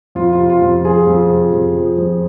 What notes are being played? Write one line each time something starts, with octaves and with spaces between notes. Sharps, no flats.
F2 F4
F4
C3
F4
F2
F3 F4 G#4
F2
C3
F2
F3
F2